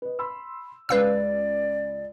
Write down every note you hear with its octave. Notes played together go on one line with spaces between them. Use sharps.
B4 D#5
B5 C6 E6
C#2 G#3 B4 D5 F5 E6